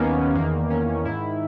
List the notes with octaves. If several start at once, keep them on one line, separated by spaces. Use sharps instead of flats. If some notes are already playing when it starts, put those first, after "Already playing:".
Already playing: D#2 D#3 A#3 B3 C#4
E2 D#3 A#3
C#4
G#2 D#3 E4